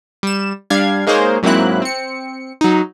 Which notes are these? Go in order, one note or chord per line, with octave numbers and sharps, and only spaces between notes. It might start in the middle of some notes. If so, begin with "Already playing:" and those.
G3 E7
G3 D4 F5 G#6
G#3 A#3 D#4 G#4 C5 C#5
G#2 F#3 A#3 C4 E4 F#6
C4 C#7
F#3 D#4